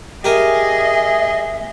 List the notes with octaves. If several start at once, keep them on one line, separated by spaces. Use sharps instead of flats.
G4 G#4 A#4 D#5 E5 G#5